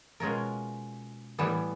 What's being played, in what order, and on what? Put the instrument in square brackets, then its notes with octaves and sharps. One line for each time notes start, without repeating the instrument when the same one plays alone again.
[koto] B2 G#3 C#4 F4 A#4
A2 E3 G3 B3